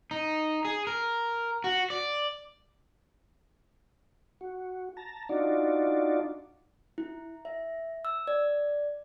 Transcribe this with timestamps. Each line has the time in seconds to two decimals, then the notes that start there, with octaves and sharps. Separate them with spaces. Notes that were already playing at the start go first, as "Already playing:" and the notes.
0.11 D#4
0.65 G#4
0.87 A#4
1.64 F#4
1.90 D5
4.41 F#4
4.97 A5 A#5
5.29 D4 D#4 F4 F#4 D5
6.98 E4
7.45 E5
8.05 E6
8.27 D5